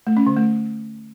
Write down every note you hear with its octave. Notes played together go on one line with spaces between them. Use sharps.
A3
C#4
D3
A3